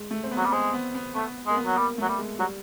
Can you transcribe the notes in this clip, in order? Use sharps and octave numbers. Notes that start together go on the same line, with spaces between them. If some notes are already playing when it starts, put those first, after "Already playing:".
Already playing: G#3
A3
C4
B3
F#3
G3
G#3 C4
B3
B3
A3 B3
G#3 A#3
B3
F#3
G3 A#3
F#3 A3
G3
G#3
F#3 G3